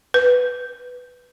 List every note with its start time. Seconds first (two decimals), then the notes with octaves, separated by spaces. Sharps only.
0.14 B4